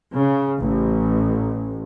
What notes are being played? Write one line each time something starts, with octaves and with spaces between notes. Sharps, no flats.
C#3
A1